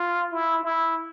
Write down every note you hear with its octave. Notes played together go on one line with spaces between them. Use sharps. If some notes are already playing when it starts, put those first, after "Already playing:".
Already playing: F4
E4
E4